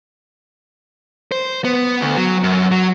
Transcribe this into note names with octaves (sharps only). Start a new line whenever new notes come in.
C5
B3
D2
F#3
F#2
F#3